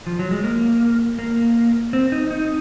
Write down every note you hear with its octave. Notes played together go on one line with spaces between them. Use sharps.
F3
F#3
G#3
A#3
A#3
C4
D#4
D#4